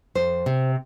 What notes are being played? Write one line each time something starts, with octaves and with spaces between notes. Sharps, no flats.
F2 C5
C3